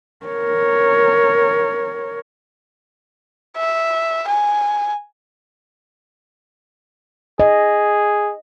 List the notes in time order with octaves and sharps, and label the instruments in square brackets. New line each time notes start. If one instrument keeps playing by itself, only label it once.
[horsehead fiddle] A#4 C#5
[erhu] E5
G#5
[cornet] G#4 [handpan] D#5